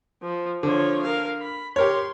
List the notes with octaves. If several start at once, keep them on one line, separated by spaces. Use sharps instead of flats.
F3
D3 F3 C#5
A#4 F5
B5
G4 A#4 C#5 C6